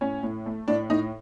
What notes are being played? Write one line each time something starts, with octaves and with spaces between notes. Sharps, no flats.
A2 C#4
A2
A3
A2 D4
A2 D#4